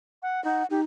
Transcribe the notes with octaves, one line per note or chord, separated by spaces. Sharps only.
F#5
D#4 F#5
D#4 G4